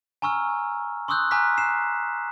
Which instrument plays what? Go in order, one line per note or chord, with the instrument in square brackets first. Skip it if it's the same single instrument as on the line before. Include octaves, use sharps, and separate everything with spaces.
[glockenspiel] G#5 A#5 C#6 E6 F6
C6 C#6 D#6 E6 F#6 G6
G#5 A#5 D6 F6 F#6 B6
C7 E7